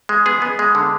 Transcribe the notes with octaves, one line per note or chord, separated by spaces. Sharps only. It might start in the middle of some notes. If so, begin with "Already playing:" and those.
G#3
B3 G#4
B3
G#3
D3